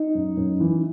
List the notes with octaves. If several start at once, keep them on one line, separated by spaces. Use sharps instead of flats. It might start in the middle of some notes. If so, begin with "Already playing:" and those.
Already playing: D#4
F#2
F#2
E3